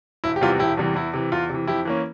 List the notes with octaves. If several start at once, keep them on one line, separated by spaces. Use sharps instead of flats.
E1 E4
G4
E2 C3 E3 G3 F4
E1 E4 G4
E2 C3 E3 G3
E2 E4
C3 E3
E2 F4
C3 E3
F2 E4 G4
E3 A#3 C#4